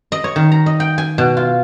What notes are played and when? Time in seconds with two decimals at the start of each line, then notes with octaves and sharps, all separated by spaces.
0.12 D#5
0.24 C#5
0.36 D#3
0.52 A#5
0.66 D#5
0.80 G5
0.98 G#5
1.18 B2
1.37 F4